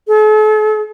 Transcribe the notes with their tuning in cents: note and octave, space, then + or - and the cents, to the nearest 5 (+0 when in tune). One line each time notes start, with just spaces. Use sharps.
A4 -45